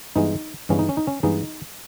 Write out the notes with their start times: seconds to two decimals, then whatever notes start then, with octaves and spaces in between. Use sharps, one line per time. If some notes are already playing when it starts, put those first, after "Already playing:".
0.16 G2 E3 G#3 B3 D#4
0.69 G2 E3 G#3 B3 C#4
0.79 D#4
0.89 C#4
0.97 D#4
1.07 C#4
1.23 G2 E3 G#3 B3 D#4